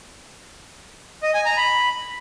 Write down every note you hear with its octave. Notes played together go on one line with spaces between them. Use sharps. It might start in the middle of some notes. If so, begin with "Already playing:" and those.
D#5
G#5
A#5
B5